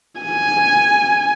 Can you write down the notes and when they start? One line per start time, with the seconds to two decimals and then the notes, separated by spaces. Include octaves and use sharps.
0.21 G#5